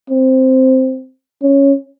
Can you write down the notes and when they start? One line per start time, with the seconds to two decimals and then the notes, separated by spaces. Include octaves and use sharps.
0.10 C4
1.43 C#4